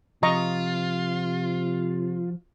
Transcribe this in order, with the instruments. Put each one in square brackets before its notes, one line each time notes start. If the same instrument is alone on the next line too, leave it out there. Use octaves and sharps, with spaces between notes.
[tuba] C3 [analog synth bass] F3 [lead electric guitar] F4 [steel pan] D#5 A#5 C#6